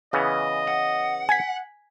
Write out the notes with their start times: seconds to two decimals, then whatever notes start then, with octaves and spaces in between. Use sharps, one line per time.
0.13 C#3 E3 B3 D#5
0.68 F#5
1.29 G#5 G#6 B6